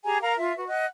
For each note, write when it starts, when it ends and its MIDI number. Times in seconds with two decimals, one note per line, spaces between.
0.05 0.20 67
0.05 0.20 68
0.05 0.20 80
0.05 0.20 82
0.21 0.35 70
0.21 0.35 77
0.21 0.35 82
0.36 0.54 65
0.36 0.54 76
0.56 0.67 66
0.56 0.67 71
0.67 0.86 75
0.67 0.86 78
0.67 0.86 90